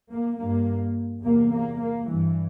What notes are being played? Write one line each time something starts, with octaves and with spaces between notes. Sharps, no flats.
A#3
G2 A#3
E2 C3 A#3
A#3
A#3
G2 E3